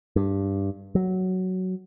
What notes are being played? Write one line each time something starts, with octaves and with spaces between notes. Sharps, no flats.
G2
F#3